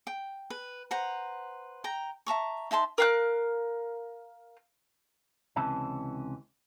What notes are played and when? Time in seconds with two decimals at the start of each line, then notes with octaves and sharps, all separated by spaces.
0.07 G5
0.50 B4
0.91 B4 C5 F#5 A#5
1.84 G5 A#5
2.27 E5 A5 A#5 C#6
2.71 D#4 E5 A5 C6
2.98 A#4 F5 F#6
5.56 C#2 C3 E3 C#4 A5